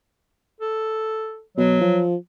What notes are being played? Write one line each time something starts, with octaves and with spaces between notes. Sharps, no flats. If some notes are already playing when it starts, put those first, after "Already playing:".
A4
B2 F#3
F3